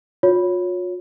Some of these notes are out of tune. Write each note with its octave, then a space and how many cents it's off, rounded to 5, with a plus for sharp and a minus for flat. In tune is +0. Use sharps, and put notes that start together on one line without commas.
F4 +45 C#5 +5